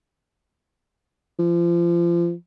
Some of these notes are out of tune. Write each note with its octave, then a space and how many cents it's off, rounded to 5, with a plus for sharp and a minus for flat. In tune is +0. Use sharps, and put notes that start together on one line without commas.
F3 -30